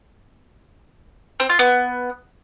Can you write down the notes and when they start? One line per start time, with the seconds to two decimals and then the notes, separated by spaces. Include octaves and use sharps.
1.40 C4
1.49 F4
1.59 B3